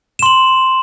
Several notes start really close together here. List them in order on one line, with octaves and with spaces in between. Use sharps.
E7 C6 F#7